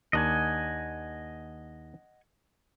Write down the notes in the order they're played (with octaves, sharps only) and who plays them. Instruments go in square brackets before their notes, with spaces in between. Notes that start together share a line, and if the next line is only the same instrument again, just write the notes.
[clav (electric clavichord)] D#2 D4 [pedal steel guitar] D#5 F#5 G#5